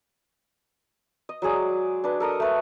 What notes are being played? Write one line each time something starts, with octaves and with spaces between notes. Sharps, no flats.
D#5
F#3 G#3 G#4 D5
D4 B4
A4 A#4 D#5 D#6
A3 B4